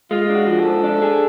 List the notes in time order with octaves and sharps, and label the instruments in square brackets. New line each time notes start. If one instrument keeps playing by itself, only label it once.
[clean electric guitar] G#3 [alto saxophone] F4
[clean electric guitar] D4
[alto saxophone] F#4
[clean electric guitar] F3
[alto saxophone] A4
[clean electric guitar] G#2
D4
G#4